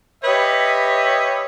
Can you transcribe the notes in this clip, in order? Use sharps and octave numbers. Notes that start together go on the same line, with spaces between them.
G4 B4 C#5 D#5 E5